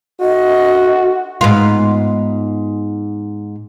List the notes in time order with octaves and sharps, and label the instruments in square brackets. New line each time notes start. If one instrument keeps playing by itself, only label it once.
[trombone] F#4 [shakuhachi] D#5
[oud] G#2 B3 F4